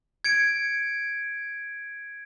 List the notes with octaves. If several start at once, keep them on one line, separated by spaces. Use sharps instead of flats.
G#6 C#7 D7